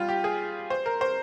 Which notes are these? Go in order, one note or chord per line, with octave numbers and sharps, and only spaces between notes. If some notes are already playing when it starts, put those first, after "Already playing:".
Already playing: G3 F4
G4
G#4
C5
A#4
C5